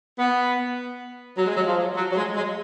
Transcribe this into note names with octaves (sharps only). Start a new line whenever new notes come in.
B3
F#3
G#3
F#3
F3
F#3
F#3
G#3
G#3